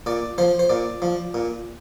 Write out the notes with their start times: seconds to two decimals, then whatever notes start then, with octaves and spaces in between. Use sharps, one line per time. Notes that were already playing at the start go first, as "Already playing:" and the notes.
0.06 A#2 D5
0.38 F3 C5
0.59 C5
0.69 A#2 D5
1.02 F3
1.34 A#2